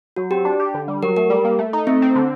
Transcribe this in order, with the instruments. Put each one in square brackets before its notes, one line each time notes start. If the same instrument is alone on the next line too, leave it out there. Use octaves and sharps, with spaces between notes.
[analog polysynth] F#3 [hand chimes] F#4
[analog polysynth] C4 [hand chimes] G4
[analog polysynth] D4
G4
D3
G3
[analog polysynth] F#3 [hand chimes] A#4
[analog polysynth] A3 [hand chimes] A#4
[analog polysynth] G3
A#3
A3
D#4
[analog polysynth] A3 [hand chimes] C4
[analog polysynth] C4
D3